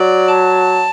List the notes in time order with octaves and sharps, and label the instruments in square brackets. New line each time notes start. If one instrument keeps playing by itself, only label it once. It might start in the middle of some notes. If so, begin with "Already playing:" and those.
Already playing: [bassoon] F#3 [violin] D5
[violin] A5